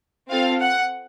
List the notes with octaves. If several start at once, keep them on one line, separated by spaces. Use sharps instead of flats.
C4 F4 A4 F5
F#5